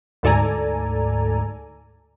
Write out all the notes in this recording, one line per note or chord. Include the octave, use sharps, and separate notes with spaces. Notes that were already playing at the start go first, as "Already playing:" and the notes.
D2 G#2 A4 D5 G#5 A#5